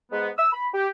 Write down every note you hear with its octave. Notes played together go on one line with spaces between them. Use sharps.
G#2 B3
E6
B5
G4